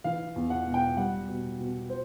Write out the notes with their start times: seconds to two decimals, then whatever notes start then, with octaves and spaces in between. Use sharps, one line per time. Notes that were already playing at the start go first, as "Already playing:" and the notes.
0.04 E3 F5
0.36 E2
0.50 F#5
0.67 E1
0.74 G5
0.97 G3 F#5
1.28 B2
1.59 B2
1.90 C5